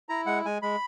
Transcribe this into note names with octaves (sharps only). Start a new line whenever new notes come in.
E4 A#5
G#3 F#5
G#3 G#5
G#3 B5